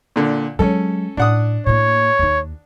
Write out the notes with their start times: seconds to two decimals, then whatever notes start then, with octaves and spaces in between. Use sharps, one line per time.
0.16 A#2 D3
0.59 F#3 G#3 C#4 A4
1.17 A2 D4 F#5 D#6
1.66 A2 A#3 C#5
2.19 D#2 D#4